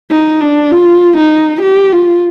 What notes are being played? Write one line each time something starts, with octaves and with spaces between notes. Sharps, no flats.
D#4
D4
F4
D#4
G4
F4